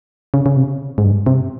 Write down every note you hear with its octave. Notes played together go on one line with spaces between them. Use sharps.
C#3
C#3
C3
G#2
G2
C3